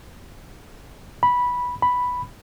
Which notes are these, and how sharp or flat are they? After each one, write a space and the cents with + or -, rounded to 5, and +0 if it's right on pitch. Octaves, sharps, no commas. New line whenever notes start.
B5 -10
B5 +0